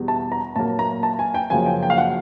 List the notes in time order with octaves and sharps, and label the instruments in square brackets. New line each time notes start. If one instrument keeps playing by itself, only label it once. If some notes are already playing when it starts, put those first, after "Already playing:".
Already playing: [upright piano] E2 B2 G3 B3
A5
A#5
A#2 F#3 A#3 A5
A#5
A5
G#5
G5
F#2 C#3 F3 A#3 G#5
G5
G5
F5
F#5